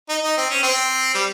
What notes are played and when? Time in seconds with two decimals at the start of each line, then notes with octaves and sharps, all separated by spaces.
0.09 D#4
0.23 D#4
0.37 C4
0.50 C#4
0.63 C4
1.14 G3